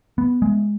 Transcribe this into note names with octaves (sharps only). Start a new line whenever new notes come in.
B3
G#3